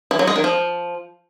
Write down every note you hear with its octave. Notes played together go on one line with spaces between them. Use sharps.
E3
F#3
G#3
D#3
F3